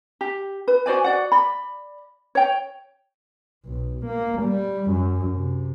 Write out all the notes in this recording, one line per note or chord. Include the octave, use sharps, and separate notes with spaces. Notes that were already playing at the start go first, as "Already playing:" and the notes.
G4
B4
F#4 C5 D5 G#5
F#4 D5 F#5
D5 B5
C#5 G5
B1
A#3
G3
F#2
C3